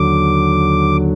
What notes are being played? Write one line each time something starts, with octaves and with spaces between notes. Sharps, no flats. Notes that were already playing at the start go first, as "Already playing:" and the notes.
Already playing: D#2 D3 F#3 D6